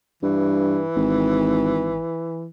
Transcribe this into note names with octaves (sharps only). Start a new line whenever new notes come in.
G2 E3
G#1